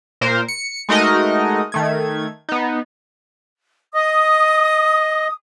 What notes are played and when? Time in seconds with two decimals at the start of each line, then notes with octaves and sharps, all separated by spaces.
0.21 A#2 A#4 C5
0.48 C#7
0.89 G#3 A3 D#4 F#4 A#4 D#5
1.72 D#3 A3 G#6
2.49 B3 D#4
3.94 D#5 D#6